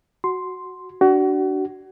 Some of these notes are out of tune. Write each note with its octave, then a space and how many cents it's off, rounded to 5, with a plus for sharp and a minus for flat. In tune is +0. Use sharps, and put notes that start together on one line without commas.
F#4 +0 C6 +0
D4 +0 F#4 +30